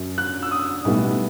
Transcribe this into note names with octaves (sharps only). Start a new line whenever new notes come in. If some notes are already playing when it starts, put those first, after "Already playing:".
Already playing: F#2 F#3
F#6
E6
D#6
B1 A2 G3 B3